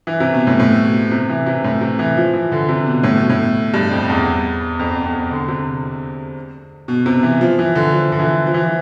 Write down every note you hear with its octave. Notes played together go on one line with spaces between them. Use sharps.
E3
C3
B2
A2
A2
B2
C3
E3
C3
A2
C3
E3
F3
E3
D3
C3
B2
A2
B2
A2
G2
F2
E2
F2
F2
D3
C3
B2
C3
E3
F3
E3
D3
F3
D3
E3
F3
E3
F3